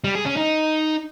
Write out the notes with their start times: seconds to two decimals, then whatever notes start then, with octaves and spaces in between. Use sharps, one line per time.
0.04 G3
0.15 G#4
0.26 C#4
0.37 D#4